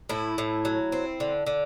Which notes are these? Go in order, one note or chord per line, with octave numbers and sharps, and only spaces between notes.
A2 E4
A2
F#3
C4
D3
D3